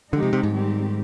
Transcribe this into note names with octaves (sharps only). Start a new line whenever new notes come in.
D3 F3 G#3 D#4 G4
C3
C3
G#2
D#3 G3 C4 G4